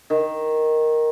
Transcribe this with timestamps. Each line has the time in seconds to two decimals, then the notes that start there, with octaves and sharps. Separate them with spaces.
0.10 D#3